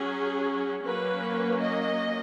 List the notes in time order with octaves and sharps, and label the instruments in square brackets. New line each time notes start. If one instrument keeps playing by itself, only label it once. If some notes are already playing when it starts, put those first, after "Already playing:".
Already playing: [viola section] F#3 C#4 G#4
F#3 A#3 C#4 B4
D#5